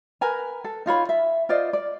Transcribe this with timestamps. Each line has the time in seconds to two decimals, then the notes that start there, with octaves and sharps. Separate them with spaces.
0.21 A#4 B4 G#5 A#5
0.64 A4
0.86 D#4 F4 C#5 B5
1.09 E5
1.49 F4 C5 D5 D#5
1.73 D5